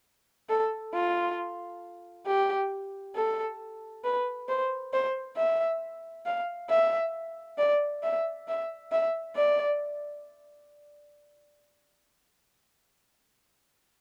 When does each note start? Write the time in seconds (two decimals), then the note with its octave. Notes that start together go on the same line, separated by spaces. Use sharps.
0.50 A4
0.94 F4
2.27 G4
3.16 A4
4.04 B4
4.48 C5
4.93 C5
5.37 E5
6.26 F5
6.70 E5
7.58 D5
8.03 E5
8.48 E5
8.92 E5
9.36 D5